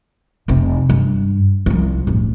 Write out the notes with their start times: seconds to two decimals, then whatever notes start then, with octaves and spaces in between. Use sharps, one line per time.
0.48 F1 C3
0.89 G2
1.66 C2 F3
2.07 D1 A1